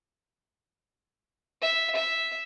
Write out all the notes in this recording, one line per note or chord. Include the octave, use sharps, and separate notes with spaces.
E5
E5